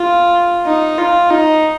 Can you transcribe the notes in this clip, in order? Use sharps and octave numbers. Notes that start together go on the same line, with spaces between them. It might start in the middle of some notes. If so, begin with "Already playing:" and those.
Already playing: F4
D#4
F4
D#4